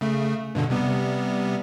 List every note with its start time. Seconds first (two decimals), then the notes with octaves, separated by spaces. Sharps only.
0.01 C#3 A3
0.55 G2 B2 D3
0.70 C3 G3 B3